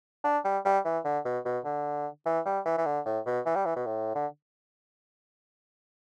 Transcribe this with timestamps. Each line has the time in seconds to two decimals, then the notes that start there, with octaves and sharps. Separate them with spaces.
0.24 D4
0.44 G3
0.65 G3
0.84 E3
1.05 D3
1.25 B2
1.45 B2
1.65 D3
2.26 E3
2.45 G3
2.65 E3
2.77 E3
2.86 D3
3.06 A2
3.26 B2
3.46 E3
3.56 G3
3.65 E3
3.76 B2
3.86 A2
4.15 D3